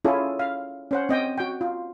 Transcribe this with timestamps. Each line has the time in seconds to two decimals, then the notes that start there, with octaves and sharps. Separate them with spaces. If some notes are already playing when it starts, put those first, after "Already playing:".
0.05 C#4 E4 F4 G#4 A4
0.39 F5
0.91 C#4 C5 F#5
1.09 C4 D#5 G5
1.38 F#4 G5
1.61 F4